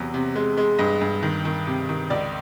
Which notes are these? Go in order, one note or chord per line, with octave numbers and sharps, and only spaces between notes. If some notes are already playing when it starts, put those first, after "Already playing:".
Already playing: E2 C3 F#3
C3
G#3
G#3
G2 D#5
G2
D#3
D#3
C3
D#3
C#2 D5